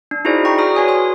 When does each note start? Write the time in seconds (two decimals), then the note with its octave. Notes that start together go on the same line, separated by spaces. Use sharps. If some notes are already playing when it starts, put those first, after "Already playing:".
0.11 D4
0.25 D#4 E4 F#4 G#4 C5 D5
0.45 G5 A#5 C#6
0.58 F#4 G#4 D5 D#6 F6
0.76 F#4 B4 C#5 G#5 D#6
0.88 C#5 G#5 C6 D#6